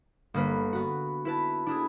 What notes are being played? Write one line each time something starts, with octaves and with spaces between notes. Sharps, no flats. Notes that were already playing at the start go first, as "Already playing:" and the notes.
G1 A#3 B4
B3 F#4
E4 B4 A5
D4 E4 G#4